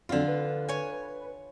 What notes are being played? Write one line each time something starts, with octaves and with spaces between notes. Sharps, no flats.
F2 D3 F#3 C4 F4
B4
C#5 G#5